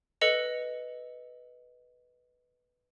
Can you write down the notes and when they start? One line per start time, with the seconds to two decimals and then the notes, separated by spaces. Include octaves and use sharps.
0.21 A4 B4 D#5 C#7 F7